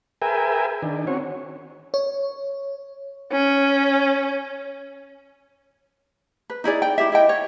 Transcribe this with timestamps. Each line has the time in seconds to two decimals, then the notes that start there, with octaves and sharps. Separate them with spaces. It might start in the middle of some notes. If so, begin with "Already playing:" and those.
0.22 G#4 A#4 B4 E5 G5 G#5
0.82 D#3 D4
1.07 C4 C#4 F#4 C#5
1.94 C#5
3.32 C#4
6.50 B4
6.64 D#4 E4 G#4 D5
6.82 G5
6.98 E4 G4 E5
7.12 E4 D#5 G5
7.29 C#5